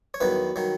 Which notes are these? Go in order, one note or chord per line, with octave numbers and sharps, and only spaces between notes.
C#5
E2 D#3 F#3 B4
D#3 F#3